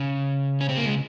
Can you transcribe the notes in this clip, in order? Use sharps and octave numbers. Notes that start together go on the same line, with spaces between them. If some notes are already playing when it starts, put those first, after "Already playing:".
Already playing: C#3
C#4
C4
A#3
G#3